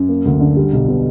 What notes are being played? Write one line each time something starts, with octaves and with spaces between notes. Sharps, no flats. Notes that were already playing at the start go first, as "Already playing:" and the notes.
Already playing: F#2
A#3
D2
D3
G3
B1
B2